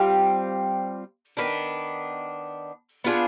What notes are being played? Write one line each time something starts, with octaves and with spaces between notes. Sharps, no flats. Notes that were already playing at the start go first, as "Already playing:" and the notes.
Already playing: G3 C4 F4
D#3 B3 D4
B3 D4 F4 G#4